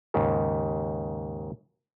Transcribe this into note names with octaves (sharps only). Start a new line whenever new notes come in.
D#2 G#2 C#3